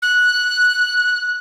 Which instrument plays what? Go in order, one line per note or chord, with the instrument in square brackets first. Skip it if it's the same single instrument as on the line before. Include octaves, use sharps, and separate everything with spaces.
[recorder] F#6